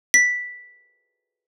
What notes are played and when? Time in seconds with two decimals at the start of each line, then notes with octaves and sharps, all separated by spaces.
0.14 B6